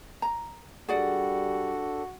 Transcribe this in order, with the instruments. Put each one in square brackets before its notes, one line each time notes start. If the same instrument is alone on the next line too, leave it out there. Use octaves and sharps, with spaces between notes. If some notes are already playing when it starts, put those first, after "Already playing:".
[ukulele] A#5
[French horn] G3 [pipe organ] D4 A4 [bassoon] F#4 [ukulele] G#4 D5 F#5